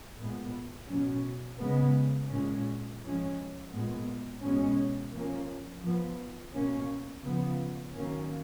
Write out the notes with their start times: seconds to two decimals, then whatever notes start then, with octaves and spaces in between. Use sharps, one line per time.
0.18 A#2 G#3 B3
0.90 B2 F#3 C#4
1.61 C#3 G#3 B3
2.30 A#2 G#3 C#4
3.01 F3 G#3 C#4
3.71 A#2 G#3 B3
4.42 B2 G#3 C#4
5.13 F3 A#3 C#4
5.83 F3 B3
6.53 B2 A#3 C#4
7.24 C#3 F3 B3
7.95 D#3 F#3 A#3 C#4